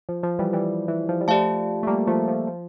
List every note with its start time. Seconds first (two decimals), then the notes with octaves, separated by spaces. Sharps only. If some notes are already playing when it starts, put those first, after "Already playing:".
0.09 F3
0.23 F3
0.39 E3 G3
0.53 E3 G3
0.88 E3
1.09 F3
1.21 G3
1.28 F3 A3 G4 D5 F5 A5
1.83 A3
1.87 G3 A#3
2.07 F3 A3
2.28 F3
2.47 F3